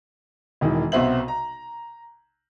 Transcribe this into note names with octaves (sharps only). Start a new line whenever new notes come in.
E1 D#3 E3
B1 C3 B3 C5 E5 F#7
A#5